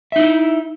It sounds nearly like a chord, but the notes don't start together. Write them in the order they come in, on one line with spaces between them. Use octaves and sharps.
E5 D#4 E4